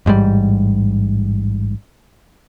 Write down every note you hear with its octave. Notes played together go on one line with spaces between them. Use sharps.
A1 G#2 B2 G3